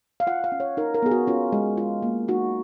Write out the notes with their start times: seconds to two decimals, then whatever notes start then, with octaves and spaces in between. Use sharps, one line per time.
0.20 F5
0.27 F4 F#5
0.44 F5
0.52 C#4
0.60 C#5
0.77 D#4 A#4
0.94 A#4
1.02 B3 G#4
1.11 F#4
1.27 C#4 F4
1.52 G#3
1.77 F4
2.02 A#3
2.28 D#4 F#4